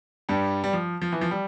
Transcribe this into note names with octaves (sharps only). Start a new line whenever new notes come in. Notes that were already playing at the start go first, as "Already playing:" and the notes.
G2 G3
G3
F3
F3
E3
F3
G3